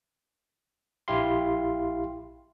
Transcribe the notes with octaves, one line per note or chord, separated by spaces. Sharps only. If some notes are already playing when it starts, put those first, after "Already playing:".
A#1 E4 G4 F5 C6